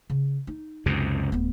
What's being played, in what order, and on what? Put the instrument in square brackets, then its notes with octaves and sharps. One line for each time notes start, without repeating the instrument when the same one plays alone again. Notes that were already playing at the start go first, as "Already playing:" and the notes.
[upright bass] C#3
D#4
[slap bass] C#2 F#2 C3
[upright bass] D1 B3